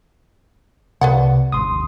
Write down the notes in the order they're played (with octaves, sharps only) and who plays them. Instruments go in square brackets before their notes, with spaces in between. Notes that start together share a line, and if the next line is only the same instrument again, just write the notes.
[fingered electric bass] C2 [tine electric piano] C3 [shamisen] B4 D5 F#5
[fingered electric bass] G#1 D#2 [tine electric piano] C6 D#6